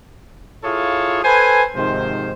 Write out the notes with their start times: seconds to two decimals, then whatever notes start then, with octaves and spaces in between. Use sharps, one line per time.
0.64 E4 F4 G#4 A4 C#5 F5
1.24 A4 B4 C5 G#5
1.75 G#2 C3 D#3 F3 C5